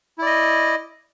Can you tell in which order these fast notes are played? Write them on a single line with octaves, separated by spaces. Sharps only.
E4 D5 D#5